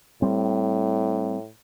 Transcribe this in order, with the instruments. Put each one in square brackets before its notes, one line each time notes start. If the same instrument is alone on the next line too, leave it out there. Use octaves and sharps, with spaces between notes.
[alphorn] A2 [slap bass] G3 C4